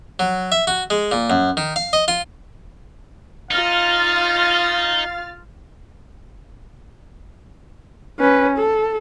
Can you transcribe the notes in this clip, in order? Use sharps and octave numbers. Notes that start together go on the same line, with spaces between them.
F#3
E5
F#4
G#3
A#2
F#2
D#3
F5
D#5
F4
D#4 F4 F5 F6 A6
C#4 B4
A4